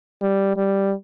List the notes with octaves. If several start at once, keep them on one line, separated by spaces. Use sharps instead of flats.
G3
G3